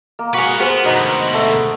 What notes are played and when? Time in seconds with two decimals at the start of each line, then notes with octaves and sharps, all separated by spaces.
0.19 A#3
0.34 F#4 G#4 B4 F5
0.60 G#3 B3 F#4 A#4 C5
0.85 D2 B2 D#4 B4
1.34 A3